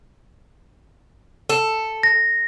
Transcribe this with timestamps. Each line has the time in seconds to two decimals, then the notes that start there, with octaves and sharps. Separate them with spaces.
1.49 A4
2.03 A#6